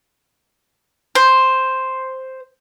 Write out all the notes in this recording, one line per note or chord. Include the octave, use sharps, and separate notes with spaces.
C5